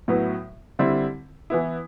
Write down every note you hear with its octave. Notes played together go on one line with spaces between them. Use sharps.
A2 F#3 B3 E4
D3 G3 C4 E4
E3 B3 E4